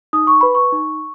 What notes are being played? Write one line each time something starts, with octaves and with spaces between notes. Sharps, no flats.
D#4 D#6
C#6
B4 B5
C#6
D#4